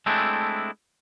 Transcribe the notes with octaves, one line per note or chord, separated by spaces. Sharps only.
G#3 A3 C4 D4 E4